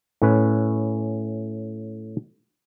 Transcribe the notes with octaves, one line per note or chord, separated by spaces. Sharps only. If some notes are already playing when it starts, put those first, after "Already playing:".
A2 C#4 B4